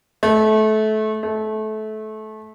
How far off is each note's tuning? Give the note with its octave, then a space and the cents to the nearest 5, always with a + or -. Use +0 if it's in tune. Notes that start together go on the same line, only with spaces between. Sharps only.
A3 -25
A3 -25